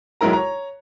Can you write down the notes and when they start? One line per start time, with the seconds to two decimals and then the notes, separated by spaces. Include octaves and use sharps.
0.21 B1 F#3 G#3 E4 A#4 A#5
0.33 C#5 A#5